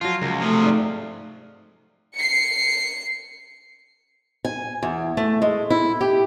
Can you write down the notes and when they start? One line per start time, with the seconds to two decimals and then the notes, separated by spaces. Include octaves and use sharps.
0.01 F3 F#3 F4
0.22 C#2 A#4
0.41 C3 F3 A3
0.63 G#2 D5
2.16 C7 C#7
4.45 G#5
4.83 E2
5.17 A3
5.42 G#3
5.70 E4
6.01 G4